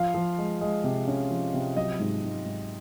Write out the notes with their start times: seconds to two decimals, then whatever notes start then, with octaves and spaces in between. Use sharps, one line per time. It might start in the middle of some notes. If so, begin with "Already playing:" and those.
Already playing: F3 F5
0.14 F3
0.38 G#3
0.61 G#3
0.84 C3
1.08 C#4
1.31 F3
1.54 C3
1.76 F#3 D#5
1.99 G#2
2.23 G#2
2.45 G#2